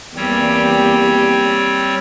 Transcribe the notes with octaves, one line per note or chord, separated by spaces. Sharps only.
E2 G3 A#3 C4 G4 C#5